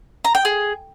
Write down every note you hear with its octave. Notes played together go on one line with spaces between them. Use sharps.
A#5
G5
G#4